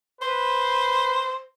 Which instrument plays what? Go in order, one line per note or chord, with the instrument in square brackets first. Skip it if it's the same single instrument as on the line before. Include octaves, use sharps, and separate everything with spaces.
[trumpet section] B4 [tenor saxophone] C5